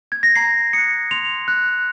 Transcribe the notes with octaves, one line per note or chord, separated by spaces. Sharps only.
G#6
A#6
A#5 C7
D#6 F#6 C#7
C6 F7
F#6